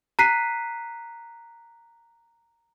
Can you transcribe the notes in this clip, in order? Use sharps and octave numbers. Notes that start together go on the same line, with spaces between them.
A#5 F#6 B6 C7 D#7